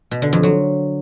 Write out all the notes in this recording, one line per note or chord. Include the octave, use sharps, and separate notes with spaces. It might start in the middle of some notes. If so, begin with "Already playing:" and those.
B2
D3
F2
F#3